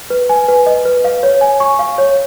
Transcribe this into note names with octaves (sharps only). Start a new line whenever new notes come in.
B4
G#5
B4
D#5
B4
F5
C#5
G#5
C#6
F5
C#5